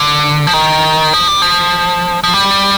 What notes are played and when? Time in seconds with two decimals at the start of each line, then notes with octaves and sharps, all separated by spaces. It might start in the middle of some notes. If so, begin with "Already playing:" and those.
Already playing: D3
0.47 F3
0.54 D#3
1.13 F3
1.28 G3
1.42 F3
2.24 F3
2.34 G3